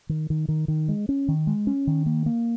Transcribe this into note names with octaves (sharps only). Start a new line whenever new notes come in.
D#3
D#3
D#3
D#3
G#3
C#4
D#3
G#3
C#4
D#3
A#3
A#3